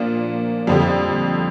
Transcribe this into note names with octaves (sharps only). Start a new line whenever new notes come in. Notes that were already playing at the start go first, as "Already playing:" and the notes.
Already playing: A#2 F3 A#3 D4
F2 D3 G3